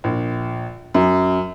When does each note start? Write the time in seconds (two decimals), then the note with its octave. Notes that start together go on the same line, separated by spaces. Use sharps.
0.04 A#1
0.94 F#2